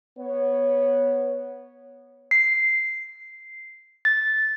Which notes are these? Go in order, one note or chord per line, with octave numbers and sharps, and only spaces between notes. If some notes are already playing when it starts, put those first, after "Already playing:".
B3 C#5
C7
A6